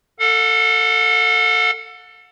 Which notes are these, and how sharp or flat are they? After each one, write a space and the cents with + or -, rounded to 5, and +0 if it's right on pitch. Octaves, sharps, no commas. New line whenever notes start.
A4 +20 F#5 -40